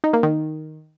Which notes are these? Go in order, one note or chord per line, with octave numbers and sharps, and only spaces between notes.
D#4
A#3
D#3